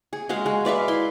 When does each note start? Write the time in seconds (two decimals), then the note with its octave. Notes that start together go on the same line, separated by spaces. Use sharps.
0.13 G#4
0.29 G#3 F#4 F5
0.46 G#3
0.65 B4 D5 E5 F5
0.88 E4 C6